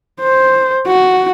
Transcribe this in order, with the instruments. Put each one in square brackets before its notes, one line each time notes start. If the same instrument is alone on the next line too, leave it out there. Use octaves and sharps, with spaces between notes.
[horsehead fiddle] C5
F#4